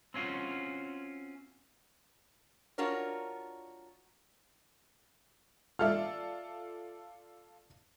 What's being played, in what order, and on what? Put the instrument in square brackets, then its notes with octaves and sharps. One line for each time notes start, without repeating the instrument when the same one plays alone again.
[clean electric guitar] C4 C#4 F4 F#4
[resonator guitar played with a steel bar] D4 F4 F#4 A#4 C#5
[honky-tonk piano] F4 A4 D5 [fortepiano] E5 F6